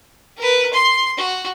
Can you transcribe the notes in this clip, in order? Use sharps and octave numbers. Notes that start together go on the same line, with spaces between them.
A#4 B4
C6
F#4